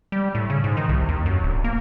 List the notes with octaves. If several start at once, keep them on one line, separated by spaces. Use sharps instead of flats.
G3
A2
C#3
G#2
D#3
C2
D#2
F#2
D1
A#3